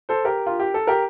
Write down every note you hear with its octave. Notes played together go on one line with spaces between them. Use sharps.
A4 C5
G4 A#4
F4
G4
A4
G4 A#4